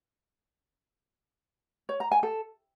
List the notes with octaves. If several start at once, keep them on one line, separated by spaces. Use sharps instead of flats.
C#5
A#5
G#5
A4